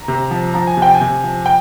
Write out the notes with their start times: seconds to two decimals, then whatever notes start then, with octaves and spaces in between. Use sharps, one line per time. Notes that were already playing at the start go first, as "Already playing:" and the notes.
Already playing: A#5
0.08 C3
0.31 F3
0.54 F3 A#5
0.67 G#5
0.77 C3
0.82 G5
0.95 G#5
1.01 C3
1.24 F3
1.46 G5